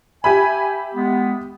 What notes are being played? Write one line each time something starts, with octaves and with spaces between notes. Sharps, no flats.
G4 E5 G#5 B5
G#3 B3